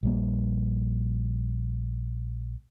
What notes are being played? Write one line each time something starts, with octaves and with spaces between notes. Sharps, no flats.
A#1 G3 A#3